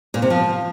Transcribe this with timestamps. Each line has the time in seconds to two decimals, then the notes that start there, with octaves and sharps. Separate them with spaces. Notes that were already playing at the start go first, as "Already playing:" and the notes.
0.14 A#2
0.22 C3
0.30 F3